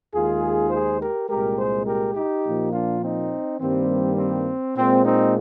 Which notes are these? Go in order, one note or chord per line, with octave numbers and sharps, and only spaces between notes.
D#2 D#3 G#3 F4 G#4
G#4 C5
G4 A#4
C2 A#2 G#3 G4 A#4
G#4 C5
G4 A#4
D#4 G4
A#2 F3 A#3
D4 F4
C4 D#4
G2 D#3 G3 A#3 C4
C4
A#2 G#3 C4
C4 D#4